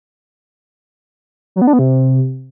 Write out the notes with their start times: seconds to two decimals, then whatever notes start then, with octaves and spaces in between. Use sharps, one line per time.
1.56 F#3
1.62 B3
1.67 D4
1.73 B3
1.79 C3